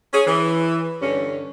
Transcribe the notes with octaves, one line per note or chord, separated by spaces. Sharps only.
C#4 G#4
E3
G2 D3 C#4